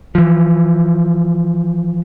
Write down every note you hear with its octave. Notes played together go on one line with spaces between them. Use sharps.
E3 F3